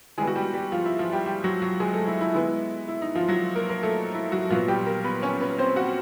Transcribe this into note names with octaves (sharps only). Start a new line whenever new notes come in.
E3 G3 G#3 B3 G#4
F#4
G3 G4
G3 G4
F3 F4
E4
F3 F4
G3 G4
G3 G4
F#3 F#4
F#3 F#4
G#3 G#4
A3 A4
E4
E4
E3 G#3 B3 E4
E4
D#4
F3 F4
F#3 F#4
A#3 A#4
A#3 A#4
A3 A4
E4
F#3 F#4
A#2 F3 F#3 B3 F4
G3 G4
A#3 A#4
B3 B4
C#4 C#5
B3 B4
C4 C5
F#4 F#5